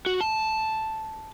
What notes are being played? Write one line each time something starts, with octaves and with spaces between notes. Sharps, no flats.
F#4
A5